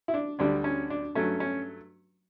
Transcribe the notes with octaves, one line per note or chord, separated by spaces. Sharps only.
E4
D4
D2 D3 G3 D4
C#4
D4
G2 F#3 A3 C#4
C#4